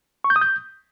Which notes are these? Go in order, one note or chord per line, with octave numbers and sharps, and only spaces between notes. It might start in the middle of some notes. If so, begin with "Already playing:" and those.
C#6
G6
D#6
G6